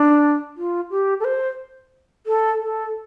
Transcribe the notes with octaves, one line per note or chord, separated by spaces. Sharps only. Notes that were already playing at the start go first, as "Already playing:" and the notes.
Already playing: D4
F4
G4
A4
C5
A4
A4